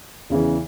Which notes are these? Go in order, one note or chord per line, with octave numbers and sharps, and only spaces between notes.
E2 C#3 E3